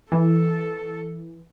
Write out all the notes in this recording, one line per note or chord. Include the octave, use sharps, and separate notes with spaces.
E3 A4